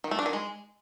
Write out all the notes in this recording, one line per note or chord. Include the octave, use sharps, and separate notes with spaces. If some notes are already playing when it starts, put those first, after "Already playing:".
D#3
A3
D4
D#3
G#3